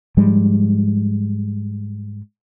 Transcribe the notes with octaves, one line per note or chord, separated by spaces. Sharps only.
G#2 F3 G3 G#3